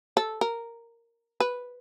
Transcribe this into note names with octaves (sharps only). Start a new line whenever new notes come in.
A4
A#4
B4